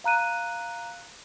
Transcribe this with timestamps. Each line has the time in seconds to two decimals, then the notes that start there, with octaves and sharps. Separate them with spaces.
0.04 F5 A#5 F#6 D#7